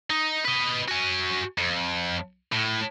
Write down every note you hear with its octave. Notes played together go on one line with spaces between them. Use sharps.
D#4
B4 D#5
F#4 G#5
F2
A2